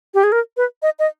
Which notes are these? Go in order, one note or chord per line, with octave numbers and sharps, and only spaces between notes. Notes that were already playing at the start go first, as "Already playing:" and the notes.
G4
G#4
A#4
B4
D#5
D#5